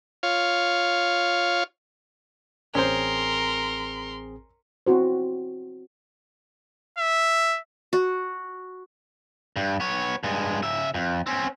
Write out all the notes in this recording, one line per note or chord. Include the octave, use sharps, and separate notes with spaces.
F4 C#5 F5
A1 C4 C#4 G#4 A#4 C5 C6
C4 E4 F#4 C5
E5
F#4
G2
B3 C#5
G2 G#3
C#3 E5
F2
C4 C#4